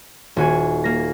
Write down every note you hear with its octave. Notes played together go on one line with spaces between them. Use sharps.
D#1 F#4 G#5
A#3 A#6